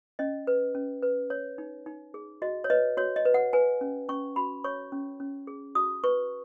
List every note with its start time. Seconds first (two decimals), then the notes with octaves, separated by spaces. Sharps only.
0.19 C#4 D#5
0.47 B4
0.75 C#4
1.02 B4
1.30 C#5
1.58 D#4
1.86 D#4
2.14 G#4
2.42 F#4 D#5
2.64 C#5
2.70 B4 D#5
2.97 F#4 C#5
3.16 D#5
3.25 B4
3.34 F#5
3.53 B4 G#5
3.81 C#4
4.09 C#4 C#6
4.36 F#4 B5
4.64 C#5 C#6
4.92 C#4
5.20 C#4
5.47 G#4
5.75 F#4 D#6
6.04 B4 C#6